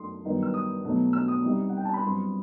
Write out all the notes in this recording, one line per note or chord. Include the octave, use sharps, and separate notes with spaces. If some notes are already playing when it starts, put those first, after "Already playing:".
Already playing: F#2 F#3 A3 D#4 C6 D#6
G2 D#3 F#3 B3 D#4
E6
D#6
B2 F#3 A3 D#4
E6
D#6
C3 E3 G3 D#4
F#5
G5
A5
B5
G2 F#3 C4 E4 C6